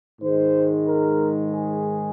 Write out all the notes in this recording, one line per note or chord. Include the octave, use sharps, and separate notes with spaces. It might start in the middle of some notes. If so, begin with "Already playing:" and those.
G#2 D#3 G#3 C5
A#4
G#4